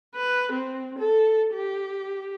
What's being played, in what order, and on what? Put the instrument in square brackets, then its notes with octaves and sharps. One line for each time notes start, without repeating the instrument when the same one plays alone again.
[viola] B4
C4
A4
G4